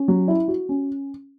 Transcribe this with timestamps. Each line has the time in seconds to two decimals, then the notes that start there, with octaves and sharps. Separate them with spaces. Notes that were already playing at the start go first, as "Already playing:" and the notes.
Already playing: C#4
0.08 F#3
0.28 E4
0.48 F#4
0.69 C#4